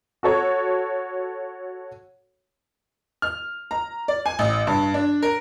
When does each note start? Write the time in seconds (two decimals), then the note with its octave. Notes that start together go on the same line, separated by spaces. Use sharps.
0.23 F#4 A4 C#5
3.22 F6
3.71 A#5
4.08 D5
4.26 G#5
4.39 A1
4.67 G2
4.94 D4
5.23 A#4